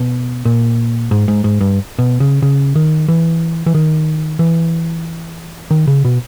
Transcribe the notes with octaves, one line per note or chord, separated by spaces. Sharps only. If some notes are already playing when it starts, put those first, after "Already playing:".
Already playing: B2
A#2
G#2
G#2
G#2
G2
B2
C#3
C#3
D#3
E3
E3
D#3
E3
D#3
C#3
B2